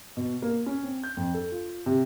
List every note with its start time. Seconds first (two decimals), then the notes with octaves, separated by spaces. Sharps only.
0.17 B2
0.42 A#3
0.66 C#4
0.83 C4
1.04 G6
1.17 F2
1.34 A4
1.52 F4
1.86 C3